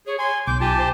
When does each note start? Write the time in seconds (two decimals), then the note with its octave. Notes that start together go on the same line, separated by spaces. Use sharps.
0.07 G#4 C#5
0.19 G#5 C6
0.47 B1 D6 G6
0.61 F4 G4 G#5 A5
0.79 C5